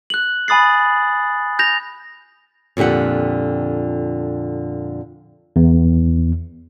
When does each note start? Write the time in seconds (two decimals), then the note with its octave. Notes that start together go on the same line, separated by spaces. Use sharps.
0.10 F#6 F#7
0.48 G#5 B5 D#6 A6 C7
1.59 G6 A#6 F7
2.77 F2 A#2 D3 G4 F#5
5.56 E2